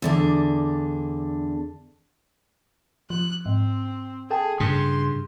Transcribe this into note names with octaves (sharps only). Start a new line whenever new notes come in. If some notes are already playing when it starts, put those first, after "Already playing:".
E2 D3 D4
F3 F#6
G#2 C4
G#4 A4 G5 A5
G2 C#3 C6 C#7